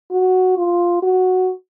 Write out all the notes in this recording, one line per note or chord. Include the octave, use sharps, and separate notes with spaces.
F#4
F4
F#4